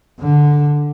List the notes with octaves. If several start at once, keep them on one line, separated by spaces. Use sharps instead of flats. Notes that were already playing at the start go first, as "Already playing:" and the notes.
D3